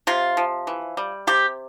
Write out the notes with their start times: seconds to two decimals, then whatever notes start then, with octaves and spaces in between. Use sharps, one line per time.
0.07 C3 F4
0.37 F3
0.67 E3
0.97 G3
1.27 C3 G4